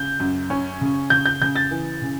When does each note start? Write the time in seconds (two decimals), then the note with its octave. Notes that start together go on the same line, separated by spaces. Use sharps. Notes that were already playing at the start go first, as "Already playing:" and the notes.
Already playing: C#3 G6
0.20 F#2
0.50 C#4
0.81 C#3
1.10 C#3 G6
1.26 G6
1.41 C#3 G6
1.56 A6
1.71 E3
2.02 C#3